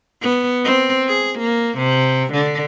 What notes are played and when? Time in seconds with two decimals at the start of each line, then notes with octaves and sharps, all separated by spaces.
0.22 B3
0.64 C4
1.08 G#4
1.39 A#3
1.78 C3
2.32 D3